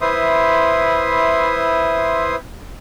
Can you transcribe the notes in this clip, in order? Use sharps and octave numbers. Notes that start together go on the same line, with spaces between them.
E4 B4 C5 E5 C6 D#6